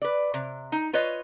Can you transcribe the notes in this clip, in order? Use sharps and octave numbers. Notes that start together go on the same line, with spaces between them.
B4 D5
C3
D#4
F4 B4 C#5 D#5